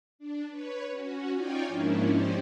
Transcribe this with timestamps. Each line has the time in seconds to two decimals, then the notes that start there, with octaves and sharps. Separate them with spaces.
0.19 D4
0.48 B4 C#5
0.89 C#4 F#4
1.32 D#4 F4 C#5 D5 G5 G#5
1.67 G#2 F3 A#3 C#4 D4 E4
2.06 C#4 D#4 G4 C5 D5